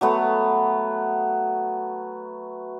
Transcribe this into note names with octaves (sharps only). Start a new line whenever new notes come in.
F#3 A3 B3